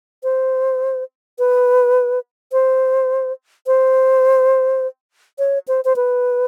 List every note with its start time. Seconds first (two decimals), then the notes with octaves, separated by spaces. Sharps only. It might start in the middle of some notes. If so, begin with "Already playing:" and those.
0.23 C5
1.39 B4
2.52 C5
3.67 C5
5.39 C#5
5.68 C5
5.85 C5
5.96 B4